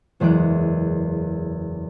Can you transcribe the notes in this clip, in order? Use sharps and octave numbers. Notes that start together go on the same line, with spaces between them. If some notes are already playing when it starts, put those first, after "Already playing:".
F#1 E2 G#3 F#6 D7